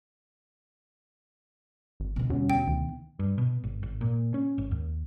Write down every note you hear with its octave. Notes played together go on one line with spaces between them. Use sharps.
G#1
B2 D3
E2 G3 C#4 F#4
E2 G5
D2 D#3
G2
B2
G#1
G#1
A#2
C#4
G#1
D#2